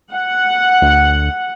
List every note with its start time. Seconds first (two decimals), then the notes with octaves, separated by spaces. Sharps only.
0.13 F#5
0.82 D2